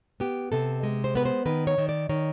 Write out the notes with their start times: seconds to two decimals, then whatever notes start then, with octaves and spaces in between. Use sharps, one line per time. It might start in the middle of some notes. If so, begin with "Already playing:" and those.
0.20 B3 G4
0.52 C3 A4
0.83 G#3
1.04 C5
1.15 B3 B4
1.25 C5
1.46 D#3 B4
1.67 C#5
1.78 D#3
1.89 D5
2.09 D#3 C#5